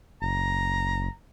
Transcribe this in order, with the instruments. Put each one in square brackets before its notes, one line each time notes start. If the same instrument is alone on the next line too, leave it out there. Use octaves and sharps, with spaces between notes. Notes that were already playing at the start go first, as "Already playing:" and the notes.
[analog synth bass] F#1 [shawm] A#5